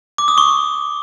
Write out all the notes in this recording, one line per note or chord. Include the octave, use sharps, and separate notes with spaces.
D6
D#6
C#6